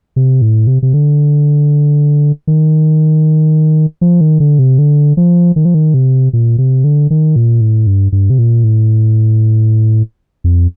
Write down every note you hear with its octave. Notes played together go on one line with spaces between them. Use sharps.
C3
A2
C3
C3
D3
D#3
F3
D#3
D3
C3
D3
F3
D#3
F3
D#3
C3
A#2
C3
D3
D#3
A#2
A2
G2
G2
C3
A#2
A2
F2